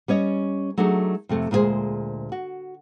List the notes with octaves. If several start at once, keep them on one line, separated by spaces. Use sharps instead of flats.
G3 C#4 C#5 D#5
F#3 A3 D4 D#4 G4 G#4
F2 C3 A3
D2 A#2 G#3 D#4 G#4 C5
F#4